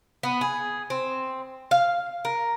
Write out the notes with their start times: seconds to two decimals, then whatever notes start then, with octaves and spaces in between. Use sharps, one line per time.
0.23 B3
0.41 G#4
0.90 C4
1.71 F5
2.25 A#4